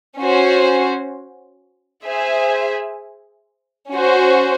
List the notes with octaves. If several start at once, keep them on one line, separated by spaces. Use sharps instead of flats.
C#4 F#4 C5
G#4 C5 E5 G#5
C#4 F#4 C5